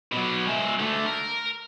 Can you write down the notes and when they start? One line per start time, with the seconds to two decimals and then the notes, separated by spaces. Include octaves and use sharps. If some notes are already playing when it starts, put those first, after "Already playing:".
0.12 B2 F#3
0.47 G#3 E5
0.79 D3 A3
1.06 A#4